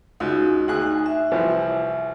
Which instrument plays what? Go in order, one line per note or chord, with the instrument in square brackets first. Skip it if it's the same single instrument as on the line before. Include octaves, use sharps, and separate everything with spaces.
[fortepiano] C#2 [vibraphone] D#4 F4 F#4
[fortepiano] D2 G#4 F#6 [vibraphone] D#4
[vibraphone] E5
[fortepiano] C2 E3 F3